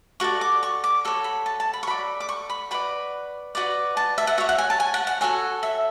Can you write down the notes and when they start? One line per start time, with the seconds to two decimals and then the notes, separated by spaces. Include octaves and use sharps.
0.20 F#4 A4 D5 C#6
0.41 D6
0.63 C#6
0.84 D6
1.05 F#4 A4 C#5
1.24 B5
1.46 A5
1.60 A5
1.73 B5
1.83 C#6
1.87 F#4 A4 D5 B5
2.20 D6
2.29 C#6
2.50 B5
2.71 F#4 B4 D5 B5
3.55 F#4 B4 D5
3.97 A5
4.18 E5
4.27 F#5
4.38 F#4 C#5 E5
4.49 F#5
4.58 G#5
4.70 A5
4.80 G#5
4.94 F#5
5.07 F#5
5.21 F#4 A4 C#5 G#5
5.63 E5